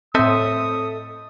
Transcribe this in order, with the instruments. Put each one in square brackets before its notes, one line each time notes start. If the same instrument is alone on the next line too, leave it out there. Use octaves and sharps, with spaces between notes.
[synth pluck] A2 C4 [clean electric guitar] A4 D#5 E5 [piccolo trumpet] D#6